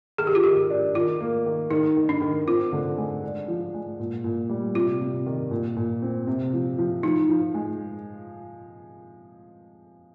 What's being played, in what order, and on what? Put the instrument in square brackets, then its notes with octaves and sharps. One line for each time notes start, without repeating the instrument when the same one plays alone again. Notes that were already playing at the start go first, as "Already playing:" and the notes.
[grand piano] D#3 [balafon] G#4
[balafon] G4
F4
[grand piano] D#3 [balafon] G4
[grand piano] D4
[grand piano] D#3 [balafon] F4
[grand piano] A#3
D#3
[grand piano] D#3 [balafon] D#4
[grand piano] D#3
[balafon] D4
[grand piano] D#3
[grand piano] C4 [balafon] F4
[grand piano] D3
G#3
D4
F3
G#3
A#2
A#2
G3
[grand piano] C3 [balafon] F4
[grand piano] C3
D#3
A#2
A#2
C4
C3
F3
F3
[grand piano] F3 [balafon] D#4
[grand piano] F3
G#3